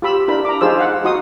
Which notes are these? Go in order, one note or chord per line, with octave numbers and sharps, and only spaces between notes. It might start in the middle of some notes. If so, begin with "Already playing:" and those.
F4 G4 B5 E6
D4 E4 A#4 B5
A#5 D6
D#4 F4 G#4 C5 E6
F5 F#5
D#4 F#4 C6 D#6